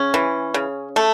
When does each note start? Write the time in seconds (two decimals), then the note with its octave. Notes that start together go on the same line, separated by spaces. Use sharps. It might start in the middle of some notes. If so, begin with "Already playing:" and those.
Already playing: C#3 C#4
0.14 E3
0.54 C#3
0.96 A3